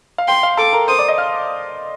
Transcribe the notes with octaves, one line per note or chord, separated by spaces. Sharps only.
F5
G5 C6
F5
A4 A5 D6
A#4 A#5
C5 C6 D#6
D5 D6
D#5 D#6
F5 F6